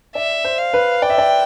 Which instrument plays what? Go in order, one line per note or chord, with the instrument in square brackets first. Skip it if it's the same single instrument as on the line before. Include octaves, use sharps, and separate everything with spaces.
[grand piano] D5 [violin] E5
[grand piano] C5
[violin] F5
[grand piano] B4
[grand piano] D5 [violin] G5
[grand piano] E5
D5